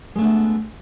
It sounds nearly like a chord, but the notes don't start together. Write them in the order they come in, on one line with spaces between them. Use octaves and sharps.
G#3 A3 D4 B3